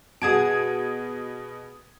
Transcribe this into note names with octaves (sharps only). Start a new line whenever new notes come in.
B2 G#4 F#5 A5 D#6 G#6 D7